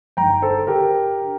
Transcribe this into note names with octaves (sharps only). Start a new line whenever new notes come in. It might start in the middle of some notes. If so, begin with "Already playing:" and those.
G1 G2 D#3 G5 A#5
A4 C5
G4 A#4
D3